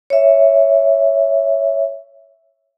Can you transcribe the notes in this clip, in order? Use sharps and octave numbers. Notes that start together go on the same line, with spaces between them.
C#5 E5